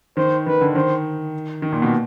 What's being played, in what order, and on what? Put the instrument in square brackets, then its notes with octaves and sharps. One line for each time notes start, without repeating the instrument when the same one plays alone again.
[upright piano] D#3 [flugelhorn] C5
[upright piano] D#3 [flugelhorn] B4
[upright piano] D3
[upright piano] D#3 [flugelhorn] C5
[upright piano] D#3
A#2
B2